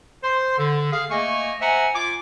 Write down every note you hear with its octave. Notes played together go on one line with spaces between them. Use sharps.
C5 C6
D3
G#4 F5
A3 A#3 D#5 G#5 C#6
C5 E5 F#5 G#5 A#5
F4 G#5 D6